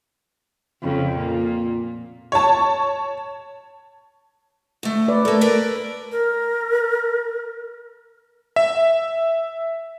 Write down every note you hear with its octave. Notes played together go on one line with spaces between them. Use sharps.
F2 C#3
A#2
C#5 A5
D2 A3
B4 D5
A3 A#3 A4
A#4 B4 D5
A#4
E5